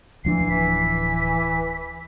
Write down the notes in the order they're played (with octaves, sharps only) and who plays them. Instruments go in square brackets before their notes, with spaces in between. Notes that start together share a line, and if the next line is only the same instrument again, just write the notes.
[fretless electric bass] D1 F3 D4 [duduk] E3 [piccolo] C7
[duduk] E3 [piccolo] B6